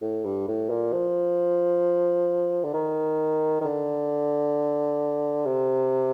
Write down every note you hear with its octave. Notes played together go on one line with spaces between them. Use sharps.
A2
G2
A2
A#2
F3
D3
D#3
D#3
D3
C3